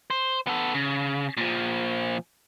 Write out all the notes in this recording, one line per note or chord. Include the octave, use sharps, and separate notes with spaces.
C5
B3 A4
C#3
A#2 F3